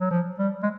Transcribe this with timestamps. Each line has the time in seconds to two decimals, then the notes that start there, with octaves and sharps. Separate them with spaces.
0.01 F#3
0.11 F3
0.39 G3
0.63 G#3